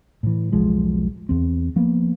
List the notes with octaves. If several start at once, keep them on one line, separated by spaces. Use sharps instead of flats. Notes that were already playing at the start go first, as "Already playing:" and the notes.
A2 E3
E1 B1 F3 G#3
E2 C4
F3 A#3 B3